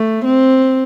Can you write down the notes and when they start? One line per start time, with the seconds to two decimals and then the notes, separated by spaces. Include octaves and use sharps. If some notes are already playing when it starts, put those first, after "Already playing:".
Already playing: A3
0.24 C4